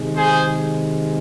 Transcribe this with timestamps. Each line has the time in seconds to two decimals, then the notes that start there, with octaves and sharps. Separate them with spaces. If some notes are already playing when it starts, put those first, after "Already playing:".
Already playing: C3 D#3 G#3
0.16 G#4 C5